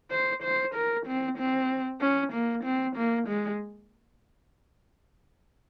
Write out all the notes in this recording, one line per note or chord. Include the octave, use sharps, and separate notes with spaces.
C5
C5
A#4
C4
C4
C#4
A#3
C4
A#3
G#3